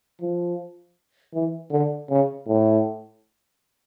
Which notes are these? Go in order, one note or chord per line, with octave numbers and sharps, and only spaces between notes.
F3
E3
D3
C#3
A2